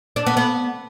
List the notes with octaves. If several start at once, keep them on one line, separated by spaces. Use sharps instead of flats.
D4
B3
B3